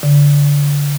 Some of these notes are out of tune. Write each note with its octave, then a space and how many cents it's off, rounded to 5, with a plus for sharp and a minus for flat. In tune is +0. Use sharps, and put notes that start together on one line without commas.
D3 -30